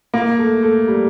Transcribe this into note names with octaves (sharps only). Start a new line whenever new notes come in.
A#3
A3
A3
G3